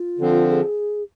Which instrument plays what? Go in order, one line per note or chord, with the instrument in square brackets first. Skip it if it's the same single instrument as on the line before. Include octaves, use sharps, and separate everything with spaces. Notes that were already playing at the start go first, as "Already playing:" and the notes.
Already playing: [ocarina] F4
[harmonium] D3 F3 C4
[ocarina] G#4